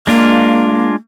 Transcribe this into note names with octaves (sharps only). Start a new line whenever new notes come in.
G#3 A#3 D4 F4